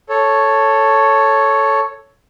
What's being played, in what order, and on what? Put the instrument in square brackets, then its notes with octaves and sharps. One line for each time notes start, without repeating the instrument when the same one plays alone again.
[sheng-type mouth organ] A4 C#5